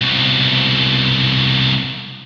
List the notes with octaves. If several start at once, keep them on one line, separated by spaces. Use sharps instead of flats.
C2 B2